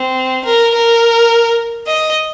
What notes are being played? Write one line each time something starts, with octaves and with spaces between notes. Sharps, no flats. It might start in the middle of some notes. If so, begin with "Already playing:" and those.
Already playing: C4
A#4
A#4
D#5